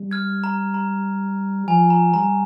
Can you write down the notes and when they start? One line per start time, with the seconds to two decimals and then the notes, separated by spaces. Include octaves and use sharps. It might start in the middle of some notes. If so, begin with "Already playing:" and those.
Already playing: G3
0.11 F6 G#6
0.44 A#5
0.74 A#5
1.67 F3 G#5
1.90 A#5
2.14 G3 A#5